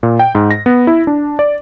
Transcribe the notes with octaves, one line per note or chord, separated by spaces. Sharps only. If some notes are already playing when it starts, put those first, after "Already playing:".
A#2
G5
G#2
A#6
B3
E4
D4
D5